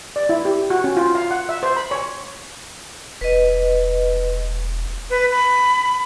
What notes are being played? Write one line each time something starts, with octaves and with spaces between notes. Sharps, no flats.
D5
E4
G4
F#4
C#4
F4
F5
F#5
E5
C5
B5
C#5
E1 B4 D#5
B4
B5